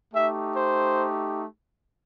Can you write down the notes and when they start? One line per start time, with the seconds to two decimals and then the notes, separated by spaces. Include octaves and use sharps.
0.14 A3 D#4 G4 E5
0.55 C5